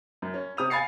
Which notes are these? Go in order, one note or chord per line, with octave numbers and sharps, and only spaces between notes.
F#2
C#4
C3 D#6 F7
F5 G#5 B5 A6 C7 C#7